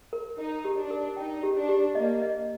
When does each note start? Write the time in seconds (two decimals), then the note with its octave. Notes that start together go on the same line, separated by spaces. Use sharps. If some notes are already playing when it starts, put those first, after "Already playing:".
0.13 A#4
0.38 D#4 A#4
0.65 G4
0.77 D4
0.91 A#4
1.17 D#4 G5
1.43 G4
1.56 D4
1.69 G4
1.95 A#3 D#5
2.22 D#5